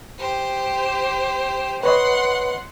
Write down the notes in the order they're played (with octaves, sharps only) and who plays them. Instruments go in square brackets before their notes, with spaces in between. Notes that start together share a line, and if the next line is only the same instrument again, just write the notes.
[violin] G4 C5
[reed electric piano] B4 C#5 D#5 [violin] F#5 C6